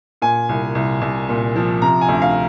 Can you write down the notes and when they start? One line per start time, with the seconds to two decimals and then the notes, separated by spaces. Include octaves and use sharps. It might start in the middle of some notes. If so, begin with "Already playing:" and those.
0.22 A#2 G#5
0.49 C2
0.75 C2
1.01 C2
1.29 A#2
1.56 F3
1.82 C3 A#5
2.01 G#5
2.08 D2
2.22 F5